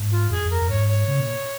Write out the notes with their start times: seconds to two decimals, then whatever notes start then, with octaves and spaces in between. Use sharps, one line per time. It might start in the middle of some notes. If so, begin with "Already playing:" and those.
Already playing: G#2
0.11 F4
0.31 F2 G#4
0.46 F2 A#4
0.62 F2
0.69 G#2 C#5
0.88 C#5
1.08 C#3
1.20 A#2